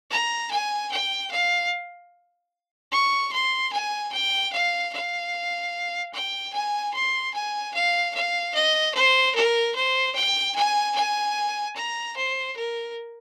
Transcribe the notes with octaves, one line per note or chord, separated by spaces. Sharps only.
A#5
G#5
G5
F5
C#6
C6
G#5
G5
F5
F5
G5
G#5
C6
G#5
F5
F5
D#5
C5
A#4
C5
G5
G#5
G#5
A#5
C5
A#4